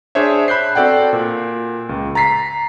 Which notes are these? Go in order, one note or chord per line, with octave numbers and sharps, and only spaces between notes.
D4 G#4 C5 C#5 E5
B5 F#6 G6 C7
C4 F#4 A4 D5 F#5 G5
A#2
C#2
A#5 A6 B6 C7